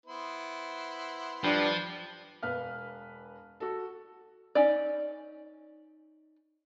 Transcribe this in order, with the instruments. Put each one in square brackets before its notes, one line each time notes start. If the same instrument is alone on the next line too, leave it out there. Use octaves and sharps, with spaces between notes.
[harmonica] B3 E4 C5
[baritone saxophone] G2 [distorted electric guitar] F3 [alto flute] D4
[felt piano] E1 B4 F5 F6
F#4 A4
[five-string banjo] C#4 D#4 D5